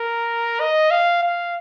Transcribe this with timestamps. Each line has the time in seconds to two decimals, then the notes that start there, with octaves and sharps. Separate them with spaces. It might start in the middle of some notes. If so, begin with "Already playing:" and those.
Already playing: A#4
0.60 D#5
0.91 F5
1.23 F5